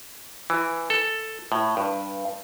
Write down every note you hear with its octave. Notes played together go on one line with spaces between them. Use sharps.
E3
A4
A2
G2